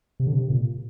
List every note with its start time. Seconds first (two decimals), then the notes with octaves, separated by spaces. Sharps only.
0.20 C3
0.27 D3
0.34 C3
0.50 A#2